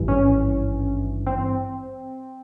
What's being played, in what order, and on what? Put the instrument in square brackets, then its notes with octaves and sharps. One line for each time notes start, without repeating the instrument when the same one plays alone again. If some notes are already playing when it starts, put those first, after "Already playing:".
Already playing: [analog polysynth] G#1 G2 E3
C#4
C4